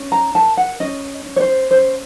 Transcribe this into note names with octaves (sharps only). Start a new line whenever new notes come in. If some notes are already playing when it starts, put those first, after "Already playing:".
Already playing: C#4
A#5
A#4 A5
F#5
C#4 D#5
C#4
C#5
C5
C#4 C5